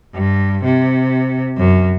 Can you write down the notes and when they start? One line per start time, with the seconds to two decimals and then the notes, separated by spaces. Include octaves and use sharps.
0.14 G2
0.64 C3
1.58 F#2